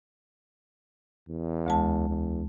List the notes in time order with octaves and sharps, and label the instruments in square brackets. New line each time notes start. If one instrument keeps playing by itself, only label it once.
[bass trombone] E2
[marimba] D2 G#3 A5
[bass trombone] E2